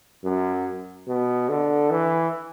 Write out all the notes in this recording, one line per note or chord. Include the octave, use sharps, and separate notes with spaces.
F#2
B2
D3
E3